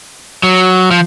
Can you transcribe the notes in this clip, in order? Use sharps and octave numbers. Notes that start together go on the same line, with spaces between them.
F#3
F3